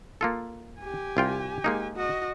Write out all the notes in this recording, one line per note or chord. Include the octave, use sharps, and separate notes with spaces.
A#3 F4 A4
G4 G#5
C2 F4 G5
G#3 A#3 D#4
F#4 D#5